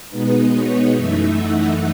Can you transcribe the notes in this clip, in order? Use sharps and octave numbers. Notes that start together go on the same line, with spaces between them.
B2 G#3 B3 D#4 B4
C#5
F#2 E3 A3 D#4 E5
F#5